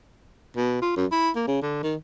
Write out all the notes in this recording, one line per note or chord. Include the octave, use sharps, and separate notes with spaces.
B2
F4
F#2
E4
A#3
C#3
D3
D#3